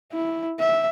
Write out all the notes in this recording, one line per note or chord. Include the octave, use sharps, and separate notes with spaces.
E4
E5